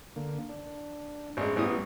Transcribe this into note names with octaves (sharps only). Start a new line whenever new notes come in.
D3 A#3
D4
A1 G#3 D4
A1 E3 G3 B3 D#6